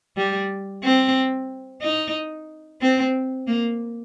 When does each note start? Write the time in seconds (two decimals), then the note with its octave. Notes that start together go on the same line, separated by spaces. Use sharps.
0.17 G3
0.83 C4
1.81 D#4
2.81 C4
3.47 A#3